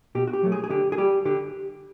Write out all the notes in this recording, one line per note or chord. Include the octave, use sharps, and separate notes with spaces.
B2 G4
F#4
G4
F#3 A3
G#4
G#4
D3 G4
G#4
G3 G4
D3 G4